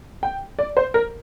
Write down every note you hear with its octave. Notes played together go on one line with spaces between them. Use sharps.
G5
D5
C5
A#4